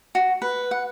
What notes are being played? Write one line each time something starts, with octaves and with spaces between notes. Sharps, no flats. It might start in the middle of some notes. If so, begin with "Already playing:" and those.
F#4
B4
F#5